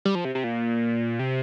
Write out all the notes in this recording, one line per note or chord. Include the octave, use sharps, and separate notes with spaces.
G3
F3
C3
C3
A#2
C3